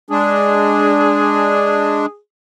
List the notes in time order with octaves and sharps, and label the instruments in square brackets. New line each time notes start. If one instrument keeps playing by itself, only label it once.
[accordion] G#3 D4 [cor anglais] G#4